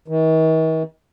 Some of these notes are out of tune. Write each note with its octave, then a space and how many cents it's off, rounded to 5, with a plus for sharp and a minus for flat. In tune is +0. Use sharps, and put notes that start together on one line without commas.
D#3 +45